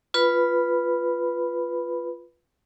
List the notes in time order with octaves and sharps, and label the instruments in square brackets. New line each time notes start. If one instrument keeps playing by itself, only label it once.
[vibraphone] F4 B4 B5